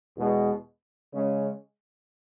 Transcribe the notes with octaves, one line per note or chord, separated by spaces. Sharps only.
E2 B2 G#3
C#3 G#3 C#4